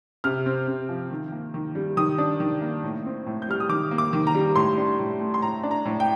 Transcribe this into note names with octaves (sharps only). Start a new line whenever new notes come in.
C3 F6
C4
C3
F3
D#3
A#3
D#3
G3
D#3 D#6
D4
D#3
A#3
A2
C4
A2
G6
G3 F6
D#6
D#3 D6
A#3
D6
D#3
A#5
G3
A2 C6
D4
A2
A3
C6
A2 A#5
D4
A#5
A2
G5